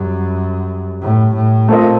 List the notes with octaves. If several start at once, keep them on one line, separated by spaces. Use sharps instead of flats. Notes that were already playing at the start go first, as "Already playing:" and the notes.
Already playing: F#2 G3
A2
A2
A#2 A3 C4 F4 A#4 D#5